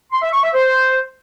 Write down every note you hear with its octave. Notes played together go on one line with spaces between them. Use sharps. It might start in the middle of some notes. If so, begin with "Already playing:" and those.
C6
E5
C#6
E5
C5